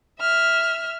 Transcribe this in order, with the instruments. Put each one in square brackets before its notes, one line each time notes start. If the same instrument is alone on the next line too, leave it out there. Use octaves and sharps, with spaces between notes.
[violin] E5 F6